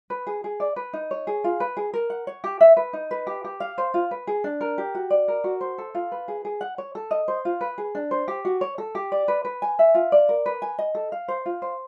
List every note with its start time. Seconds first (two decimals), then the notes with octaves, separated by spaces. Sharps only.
0.10 B4
0.27 G#4
0.44 G#4
0.60 D5
0.76 B4
0.93 D#4
1.11 C#5
1.27 G#4
1.44 F4
1.60 B4
1.77 G#4
1.94 A#4
2.10 F#5
2.27 C#5
2.44 G4
2.61 E5
2.77 B4
2.93 D#4
3.11 B4
3.27 G4
3.44 G4
3.60 F5
3.78 C5
3.94 F4
4.11 B4
4.27 G#4
4.44 D4
4.61 A#4
4.78 G4
4.95 F#4
5.10 D5
5.28 A#4
5.44 F#4
5.61 C5
5.78 A4
5.95 F4
6.12 B4
6.28 G#4
6.45 G#4
6.61 F#5
6.78 C#5
6.95 A4
7.11 D#5
7.28 C5
7.45 F4
7.61 B4
7.78 G#4
7.95 D4
8.11 C5
8.28 G4
8.45 F#4
8.61 C#5
8.78 A4
8.95 G4
9.12 D5
9.28 B4
9.45 B4
9.62 G#5
9.79 E5
9.94 F4
10.12 D5
10.29 A#4
10.46 B4
10.62 G#5
10.79 D#5
10.95 A4
11.12 F5
11.28 C5
11.46 F4
11.62 C5